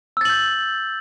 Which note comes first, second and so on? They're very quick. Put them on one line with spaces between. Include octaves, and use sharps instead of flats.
E6 A6 F#7 G6